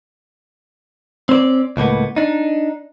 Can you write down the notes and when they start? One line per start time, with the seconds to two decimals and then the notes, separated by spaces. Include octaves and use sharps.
1.29 C4 C#4 C5 D5
1.77 C#2 A2 A#3 B3
2.16 D4 D#4